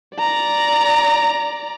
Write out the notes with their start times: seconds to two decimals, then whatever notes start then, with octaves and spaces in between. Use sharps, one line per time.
0.16 D5 A#5